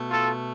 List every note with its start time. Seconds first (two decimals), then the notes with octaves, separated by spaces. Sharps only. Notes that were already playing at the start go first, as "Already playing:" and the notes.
Already playing: B2 A3
0.10 F4 A4